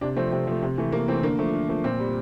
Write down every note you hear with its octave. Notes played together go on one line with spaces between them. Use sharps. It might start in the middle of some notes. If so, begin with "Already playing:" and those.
C3 D4
F3 A3 C4
C3 C4
F3 A3
C3
E3 A3
C3 A#3
E3 A3 C4
D3 A#3
F3 A3
D3
F3 A3
A#2 C4
G3